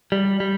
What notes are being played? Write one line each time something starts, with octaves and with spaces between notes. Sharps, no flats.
G3
G3